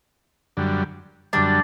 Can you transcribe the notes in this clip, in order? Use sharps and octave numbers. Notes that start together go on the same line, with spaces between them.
F#2 D3 G3
F#2 D3 G3 D4